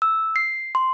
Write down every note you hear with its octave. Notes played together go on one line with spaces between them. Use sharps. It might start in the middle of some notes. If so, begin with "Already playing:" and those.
E6
C7
C6